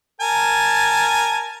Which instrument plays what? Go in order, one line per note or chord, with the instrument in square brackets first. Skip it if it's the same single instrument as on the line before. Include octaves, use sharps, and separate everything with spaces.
[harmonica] A#4 G#5 A5